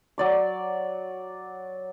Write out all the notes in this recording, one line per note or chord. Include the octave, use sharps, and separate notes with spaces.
F#3 D5 D6